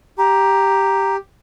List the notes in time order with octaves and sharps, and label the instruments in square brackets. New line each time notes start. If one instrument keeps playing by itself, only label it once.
[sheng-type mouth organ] G4 [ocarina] A#5